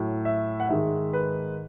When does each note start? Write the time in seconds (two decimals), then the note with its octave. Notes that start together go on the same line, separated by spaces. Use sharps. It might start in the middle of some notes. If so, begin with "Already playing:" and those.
Already playing: A2 F#3
0.25 E5
0.60 F#5
0.69 G#2 D#3 G#3 E5
1.13 B4